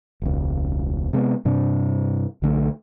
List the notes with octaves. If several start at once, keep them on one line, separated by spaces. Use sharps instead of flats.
E1 C#2
C3 G#3 A3 B3
G2 C3 D4
B1 D3 A3